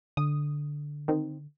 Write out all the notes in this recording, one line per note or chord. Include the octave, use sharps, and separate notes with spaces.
D3 D#6
D#3 C4 D#4